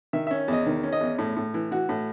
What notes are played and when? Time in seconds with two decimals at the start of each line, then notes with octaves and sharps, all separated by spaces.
0.13 D#3 E5
0.27 C#4 E5
0.48 E2 D#5
0.66 D#3
0.83 C#4
0.92 D#5
1.01 E2
1.19 A2
1.37 A2
1.54 E3
1.71 E3 F#4
1.89 A2